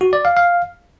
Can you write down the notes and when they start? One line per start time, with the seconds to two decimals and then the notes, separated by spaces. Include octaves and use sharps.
0.01 F#4
0.13 D5
0.25 F5
0.37 F5